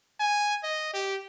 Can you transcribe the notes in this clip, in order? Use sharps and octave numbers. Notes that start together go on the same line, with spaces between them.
G#5
D#5
G4